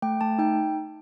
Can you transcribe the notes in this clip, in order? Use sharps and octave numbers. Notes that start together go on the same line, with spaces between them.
A3 G5
A3 A5
D#4 G5